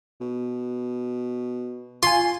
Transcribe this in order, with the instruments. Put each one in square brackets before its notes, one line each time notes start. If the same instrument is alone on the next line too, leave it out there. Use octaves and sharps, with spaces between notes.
[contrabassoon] B2
[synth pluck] F4 G#5 [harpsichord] C6